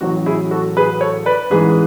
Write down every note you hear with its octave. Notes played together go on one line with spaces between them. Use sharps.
A1 A2 F#3 F#4
E4 G#4
F#4 A4
G#4 B4
A4 C#5
B4 D5
A1 G#2 E3 G#3 G#4 B4